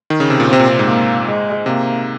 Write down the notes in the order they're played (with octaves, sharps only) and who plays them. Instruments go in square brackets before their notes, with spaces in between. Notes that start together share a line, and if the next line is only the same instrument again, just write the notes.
[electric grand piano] D#3
C#3
C3
A#2
[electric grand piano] C3 [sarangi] C4
[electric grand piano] A#2
C3
G#2
[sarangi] A#3
G#3
[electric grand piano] C3 [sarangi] A#3